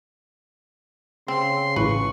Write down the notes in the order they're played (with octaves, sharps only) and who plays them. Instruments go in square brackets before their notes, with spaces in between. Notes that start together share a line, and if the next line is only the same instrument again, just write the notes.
[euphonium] C#3 [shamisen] C4 [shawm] C6
[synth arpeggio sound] A1 A2 [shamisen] B4 [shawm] C#6